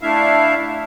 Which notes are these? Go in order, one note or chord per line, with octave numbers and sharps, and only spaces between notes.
A3 D4 E4 E5 F5